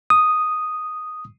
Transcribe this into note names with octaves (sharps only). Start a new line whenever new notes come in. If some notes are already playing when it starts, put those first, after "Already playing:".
D#6